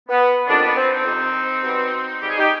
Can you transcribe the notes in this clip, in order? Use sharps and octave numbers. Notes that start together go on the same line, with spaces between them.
B3
F2 D#3 G3 B3 D4
B3
C4
C4 D#4
F2 C3 G3
B2 G3
G#2 G3 G4
G#4
D#4 G4